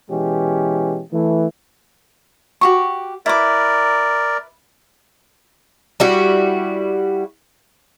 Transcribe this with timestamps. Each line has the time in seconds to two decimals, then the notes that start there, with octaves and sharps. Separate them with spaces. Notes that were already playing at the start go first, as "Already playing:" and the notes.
0.11 B2 E3 G#3 C#4 G4
1.13 E3 A3
2.61 F#4 G4 C#6
3.26 E4 A#4 B4 D5 D6
6.00 G3 E4 F#4